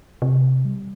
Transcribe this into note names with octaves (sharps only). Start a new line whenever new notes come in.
C3
G3